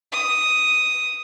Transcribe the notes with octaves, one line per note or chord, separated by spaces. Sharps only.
D#6